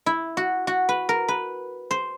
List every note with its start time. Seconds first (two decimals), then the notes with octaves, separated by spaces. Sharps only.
0.06 E4
0.37 F#4
0.67 F#4
0.89 B4
1.09 A#4
1.28 B4
1.91 C5